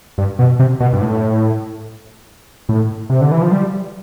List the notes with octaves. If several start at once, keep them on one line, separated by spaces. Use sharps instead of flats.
G2
B2
C3
B2
G2
A2
A2
C3
D3
E3
F3
G3